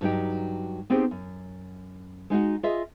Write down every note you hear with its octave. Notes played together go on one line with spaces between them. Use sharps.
G2 F#3 D#4 G4
B3 C4 D#4 G4 G#4 C5
F#2
G#3 D#4 F4 F#4
F4 G#4 D#5 E5